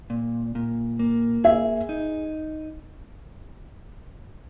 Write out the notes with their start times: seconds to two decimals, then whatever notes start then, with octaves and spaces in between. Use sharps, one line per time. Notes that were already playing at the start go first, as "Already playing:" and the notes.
0.10 A#2
0.55 A#2
0.99 A#3
1.44 G#4 E5
1.89 D#4